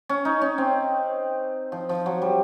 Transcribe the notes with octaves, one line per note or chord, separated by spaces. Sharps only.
C#4
D#4
C#4
C4
F3
F3
F#3
G3